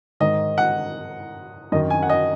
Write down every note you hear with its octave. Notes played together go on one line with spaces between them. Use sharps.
G#2 D#3 D#5
F#5
F#2 D#3 D#5
G#5
F#5
D#5